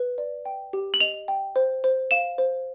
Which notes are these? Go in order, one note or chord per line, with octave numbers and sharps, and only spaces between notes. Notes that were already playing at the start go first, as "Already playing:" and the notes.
Already playing: B4
D5
G5
G4
F#7
D#5 F7
G5
C5
C5
F5 E7
C5